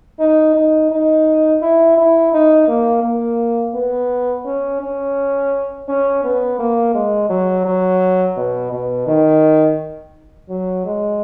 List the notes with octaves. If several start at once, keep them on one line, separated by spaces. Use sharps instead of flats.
D#4
D#4
D#4
E4
E4
D#4
A#3
A#3
B3
C#4
C#4
C#4
B3
A#3
G#3
F#3
F#3
B2
B2
D#3
F#3
G#3